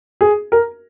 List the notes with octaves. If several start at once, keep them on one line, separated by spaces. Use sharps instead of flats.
G#4
A#4